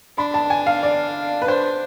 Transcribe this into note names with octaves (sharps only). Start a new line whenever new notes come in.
D4 B5
A5
G#5
F5
D5
B4
D4 C5